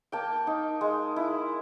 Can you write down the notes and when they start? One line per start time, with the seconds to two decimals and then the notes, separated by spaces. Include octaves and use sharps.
0.12 A#3 G5 A5
0.47 D#4
0.81 G#3
1.16 E4